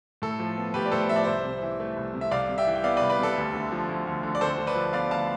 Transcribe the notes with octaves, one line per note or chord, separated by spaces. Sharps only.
A2 A4
F3
B3
A2 G4 B4
D5
A2 A4 C5
F3 E5
D5
C2 C5 E5
C3
E3
A3
C2
C3
E5
C2 D5 F5
C3
E5 G5
E3
G5
B3 D5 F5
B4 D5
C2
B4 D5
C3 A4
D2
D3
F3
D2
D2
D3
D5
D2 A4 C5
D3
B4 D5
F3
B3 D5 F5
D2 F5 A5